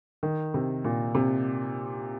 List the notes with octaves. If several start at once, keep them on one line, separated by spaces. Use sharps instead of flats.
D#3
C3
A#2
C3